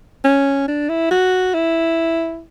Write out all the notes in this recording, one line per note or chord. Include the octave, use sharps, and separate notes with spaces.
C#4
D4
E4
F#4
E4